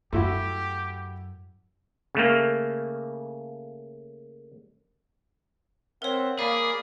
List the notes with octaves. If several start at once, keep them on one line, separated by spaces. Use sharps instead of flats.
F#2 A3 E4 F#4 G4
C#3 A3 A#3
C4 A#4 C#5 E5 F#5
A#3 G#4 D5 F5 B5 D#6